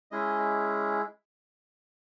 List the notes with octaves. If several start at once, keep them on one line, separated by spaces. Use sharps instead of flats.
G#3 C#4 E4 G#4 D#5